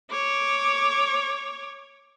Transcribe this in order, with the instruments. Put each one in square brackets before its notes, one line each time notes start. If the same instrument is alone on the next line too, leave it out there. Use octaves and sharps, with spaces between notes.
[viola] C#5 D6